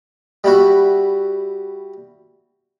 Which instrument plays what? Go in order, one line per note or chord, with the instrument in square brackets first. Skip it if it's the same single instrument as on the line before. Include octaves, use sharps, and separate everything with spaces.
[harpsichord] G3 E4 F#4